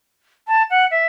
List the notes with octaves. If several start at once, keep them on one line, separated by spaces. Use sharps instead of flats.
A5
F#5
E5